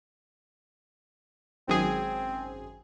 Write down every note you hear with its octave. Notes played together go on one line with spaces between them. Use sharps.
G#1 F#2 C4 G#4